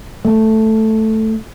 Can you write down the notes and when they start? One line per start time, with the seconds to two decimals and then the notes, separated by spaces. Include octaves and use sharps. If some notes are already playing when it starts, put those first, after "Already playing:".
0.25 A3